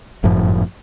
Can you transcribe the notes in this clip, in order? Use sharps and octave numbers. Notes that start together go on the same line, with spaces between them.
G1 F#2 A2 F3